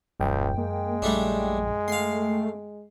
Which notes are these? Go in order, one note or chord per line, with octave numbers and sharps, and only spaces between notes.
D#1 C#2 F#2 G5
G#3 A#3
A#1 G3 A3 D4
A3 F5 C6